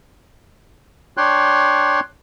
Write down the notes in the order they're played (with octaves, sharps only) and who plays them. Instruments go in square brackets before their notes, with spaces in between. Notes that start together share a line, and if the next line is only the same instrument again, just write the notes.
[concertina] D4 C#5 G5 C6 F#6